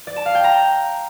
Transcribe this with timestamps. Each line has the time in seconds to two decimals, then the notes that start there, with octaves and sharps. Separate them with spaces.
0.07 D5
0.16 A5
0.26 F5
0.35 G5
0.44 A#5